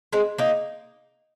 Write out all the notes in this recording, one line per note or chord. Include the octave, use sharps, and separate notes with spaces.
G#3 C4
A#3 D#4